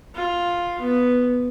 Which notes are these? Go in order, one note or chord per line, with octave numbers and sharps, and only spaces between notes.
F4
B3